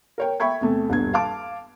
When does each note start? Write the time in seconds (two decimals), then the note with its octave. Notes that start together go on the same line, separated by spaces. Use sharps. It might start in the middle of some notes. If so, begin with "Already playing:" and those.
0.18 A#4 C#5 G5
0.40 E5 G5 B5 C#6 G#6
0.61 E2 C3 A3
0.89 D#1 G2 B2 G#6
1.13 F5 A5 D6